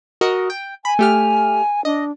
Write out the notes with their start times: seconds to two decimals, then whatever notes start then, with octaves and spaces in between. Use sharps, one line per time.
0.21 F#4 A#4 D#5
0.50 G5
0.85 G#5 B5
0.99 A3 G4 F6
1.85 D4 D#5